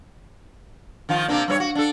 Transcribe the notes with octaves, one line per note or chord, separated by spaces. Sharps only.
D#3 F3 F4
C3 A#3 D4
G2 C4 C#5
F#4
D4 A4